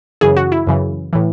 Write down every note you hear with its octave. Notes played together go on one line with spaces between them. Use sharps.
F#2 C#3 E3 G#4
F#4
E4
F#2 C#3 E3
A2 E3